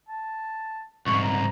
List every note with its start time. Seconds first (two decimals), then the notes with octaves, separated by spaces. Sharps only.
0.09 A5
1.06 C2 G#2 C#6
1.23 A#5